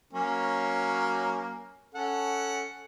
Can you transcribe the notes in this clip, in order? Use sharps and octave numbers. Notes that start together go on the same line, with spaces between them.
F#3 A#3 C#4
C#4 A4 F#5